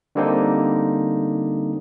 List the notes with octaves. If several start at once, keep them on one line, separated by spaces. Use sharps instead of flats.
D3 G3 A#3 C4 D4 D#4